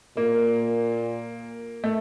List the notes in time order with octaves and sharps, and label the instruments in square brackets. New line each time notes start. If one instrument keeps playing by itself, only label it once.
[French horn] A#2 [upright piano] A#3
[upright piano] A3